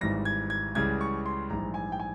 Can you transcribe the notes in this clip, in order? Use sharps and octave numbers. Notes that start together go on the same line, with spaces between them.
G#1 G#2 E3 G3 A#6
G#6
G#6
C#2 C#3 E3 G3 G#6
C#6
C6
A#1 G#2 E3 G3 A#5
G#5
G5
G#5